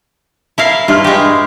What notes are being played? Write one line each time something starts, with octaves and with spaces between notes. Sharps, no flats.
E4 A#4 F5
G2 E4 F4 F6
G#3 G4